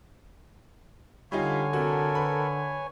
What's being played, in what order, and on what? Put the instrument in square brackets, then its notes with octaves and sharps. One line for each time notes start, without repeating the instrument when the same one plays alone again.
[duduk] D3 [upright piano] G3 D#4 F4 [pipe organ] C#5 G#5 [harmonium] F5
[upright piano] C2 F#4 [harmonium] A4 A#4
[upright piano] B4 B5